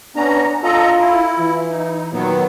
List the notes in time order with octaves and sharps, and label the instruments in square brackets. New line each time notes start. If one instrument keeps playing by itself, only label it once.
[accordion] B3 C#4 A#5 [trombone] D4
[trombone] F4 [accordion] A4 D#5 A#5
[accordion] E4
[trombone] E3
[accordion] D#4
[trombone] A#2 [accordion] D#3 F#3 B3